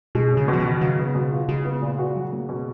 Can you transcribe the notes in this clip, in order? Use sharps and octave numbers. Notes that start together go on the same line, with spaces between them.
B2 G#3
C#4
C#3
B2 F3
D#3
F#4
C#3 F#3
B3
B2
F4
C#3 G#3
B3
A#2
F#4
F#3
A#3
B2